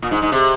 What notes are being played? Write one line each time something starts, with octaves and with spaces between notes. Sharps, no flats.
A#2
G#2
G#2
C3